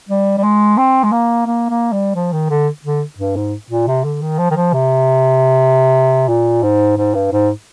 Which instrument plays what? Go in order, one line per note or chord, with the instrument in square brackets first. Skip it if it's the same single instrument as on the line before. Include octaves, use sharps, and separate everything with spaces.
[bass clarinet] G3
G3
G#3
C4
G#3
A#3
A#3
A#3
G3
F3
D#3
D3
D3
G2
G#2
A#2
C3
D3
D#3
F3
D#3
F3
C3
A#2
G#2
G#2
G2
G#2